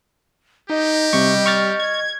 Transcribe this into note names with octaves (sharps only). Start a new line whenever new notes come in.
D#4 G4 D#5
C3 G3 C#6
C#6 F6 A6
G#6